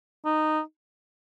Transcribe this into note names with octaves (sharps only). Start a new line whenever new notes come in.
D#4